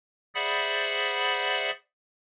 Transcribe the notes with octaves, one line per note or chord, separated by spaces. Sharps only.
G#4 C5 D5 E5 F#5 B5